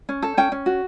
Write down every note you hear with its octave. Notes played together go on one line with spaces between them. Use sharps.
C#4
A4
C#4 G5
C#4
F#4